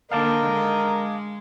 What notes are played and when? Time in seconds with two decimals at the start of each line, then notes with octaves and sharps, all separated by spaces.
0.12 D3 A#3 A#4 D#5 F5 A5 D6
0.47 G#3